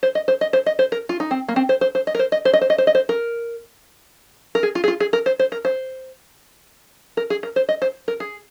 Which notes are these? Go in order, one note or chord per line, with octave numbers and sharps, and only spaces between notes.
C5
D#5
C5
D#5
C5
D#5
C5
A#4
F4
D#4
C4
A#3
C4
C5
C5
C5
D#5
A#4
C5
D#5
C5
D#5
C5
D#5
C5
D#5
C5
A#4
A#4
G#4
F4
G#4
F4
G#4
A#4
C5
C5
A#4
C5
A#4
G#4
A#4
C5
D#5
C5
A#4
G#4